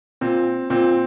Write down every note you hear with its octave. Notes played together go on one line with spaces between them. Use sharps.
A#2 C4
A#2 C4